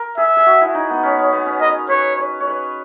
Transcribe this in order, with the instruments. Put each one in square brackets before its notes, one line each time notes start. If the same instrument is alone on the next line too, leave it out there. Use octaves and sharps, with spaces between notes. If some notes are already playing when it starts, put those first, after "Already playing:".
Already playing: [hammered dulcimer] A#4
[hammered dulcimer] G#4 [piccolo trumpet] E5
[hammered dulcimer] G#4
F#4
E4
D#4
B3
C#4
C#4
B3
C#4
[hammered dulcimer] A#4 [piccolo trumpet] D#5
[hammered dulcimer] B4 [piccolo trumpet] C#5
[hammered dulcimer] C#5
C#5
B4